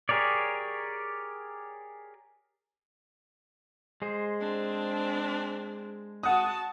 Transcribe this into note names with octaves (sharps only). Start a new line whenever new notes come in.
G4 G#4 A#4 C#5 D5
G#3 G#4 C5
C4 D4
F#4 F#5 A5 D#6